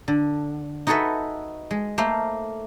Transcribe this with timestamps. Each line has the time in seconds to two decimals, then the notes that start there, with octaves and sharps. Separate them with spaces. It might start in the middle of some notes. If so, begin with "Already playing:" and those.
0.08 D3
0.87 D#4 F#4 G#4 A4 B4 E5
1.71 G#3
1.98 A3 A#3 C5 F5